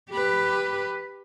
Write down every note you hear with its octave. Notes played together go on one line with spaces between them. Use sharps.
G4 B4